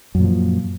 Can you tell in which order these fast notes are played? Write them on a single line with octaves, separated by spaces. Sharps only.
F#2 A#2 F3